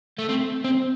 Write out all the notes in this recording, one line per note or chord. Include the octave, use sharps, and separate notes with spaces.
A3
C4
C4